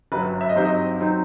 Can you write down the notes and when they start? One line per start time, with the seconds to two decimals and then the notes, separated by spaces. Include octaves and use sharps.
0.12 G1 F#2 F#3 B4
0.41 E5
0.49 D#5
0.56 G2 F#3 C4 D#4 C5
0.65 D#5
1.00 F#3 C4 D#4